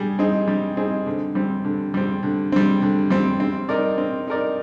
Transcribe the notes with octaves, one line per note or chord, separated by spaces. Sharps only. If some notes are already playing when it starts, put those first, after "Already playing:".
Already playing: G3 G#4
C4 D#4 G#4
G3
C4 D#4 G#4
D3
G3 C4
D3
G3 C4
D3
G3 C4
D3
G3 C4
C4
D#4 A#4 D5
C4
D#4 A#4 D5